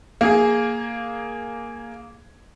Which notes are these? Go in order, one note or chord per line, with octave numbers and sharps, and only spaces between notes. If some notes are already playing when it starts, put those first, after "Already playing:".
A#3 G#4